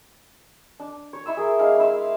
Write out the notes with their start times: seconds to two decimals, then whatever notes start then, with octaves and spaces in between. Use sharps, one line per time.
0.80 D4
1.13 C#5
1.26 E4 C6 E6
1.37 G#4 A#4
1.59 G#3 D4 F5 E6
1.79 E4 E5 F5 C6